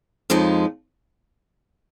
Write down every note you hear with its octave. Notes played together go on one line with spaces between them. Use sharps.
F2 F3 G#3 D#4